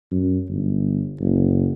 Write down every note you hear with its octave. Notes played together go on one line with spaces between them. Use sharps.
F#2
G1
F#1